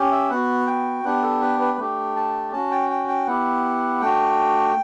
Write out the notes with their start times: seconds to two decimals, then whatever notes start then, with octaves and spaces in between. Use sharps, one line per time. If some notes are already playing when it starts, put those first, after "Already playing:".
Already playing: C#4 G4
0.12 E5
0.30 B3 F#4 F#5
0.67 G5
1.04 B3 D4 G4 F#5
1.22 A4
1.42 B4
1.61 B4
1.78 A3 D4 G4
2.16 A5
2.52 C#4 F#4 A5
2.71 G5
2.90 G5
3.08 G5
3.27 B3 E4 G4 F#5
4.01 A3 D4 F#4 G5